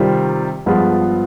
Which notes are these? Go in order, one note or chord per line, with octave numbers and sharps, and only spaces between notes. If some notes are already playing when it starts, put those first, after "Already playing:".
Already playing: C3 D#3 G3 C4 F4
G2 F3 G#3 B3 F4